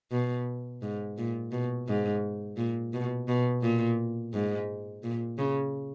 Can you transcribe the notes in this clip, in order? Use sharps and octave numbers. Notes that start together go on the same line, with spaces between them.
B2
G#2
A#2
B2
G#2
A#2
B2
B2
A#2
G#2
A#2
C#3